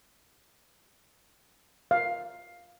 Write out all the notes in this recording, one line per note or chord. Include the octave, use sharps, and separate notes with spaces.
F5